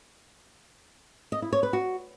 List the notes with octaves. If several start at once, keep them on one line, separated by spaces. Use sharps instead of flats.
D#5
E4
C#5
B4
F#4